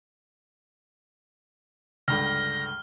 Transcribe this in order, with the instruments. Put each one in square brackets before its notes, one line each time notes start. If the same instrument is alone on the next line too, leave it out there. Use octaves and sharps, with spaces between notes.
[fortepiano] C#2 G2 D3 [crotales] F6 [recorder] A#6